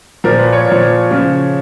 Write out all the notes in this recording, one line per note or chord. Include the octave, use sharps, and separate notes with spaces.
A#2 F3 A#4
B4
C#5
A#2 F3
C#3 F3